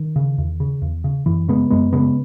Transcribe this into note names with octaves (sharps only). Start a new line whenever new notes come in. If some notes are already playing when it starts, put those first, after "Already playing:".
Already playing: D#3
C#3
E2
C#3
E2
C#3
F#2 E3
C#3 G#3 B3
F#2 G#3 B3
C#3 G#3 B3